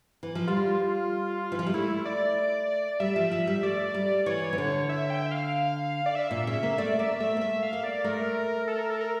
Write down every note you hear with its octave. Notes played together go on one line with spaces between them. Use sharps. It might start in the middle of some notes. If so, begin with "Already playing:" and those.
E3
F3
G3 F4
E3
F3
G3
A3 E4
D5
G3 E5
F3
F3
G3
A3 D5
G3
E3 C#5
E3
D3
E5
G5
E5
F5
D5
E5
A#2
C#3 E5
A#3
A3 D5
A#3 E5
A3 E5
A#3
A3 E5
F5
A#3
D5
A3 A#4
A4
A#4
A4
A#4